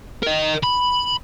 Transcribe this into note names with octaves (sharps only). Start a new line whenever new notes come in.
A#4 D#5
B5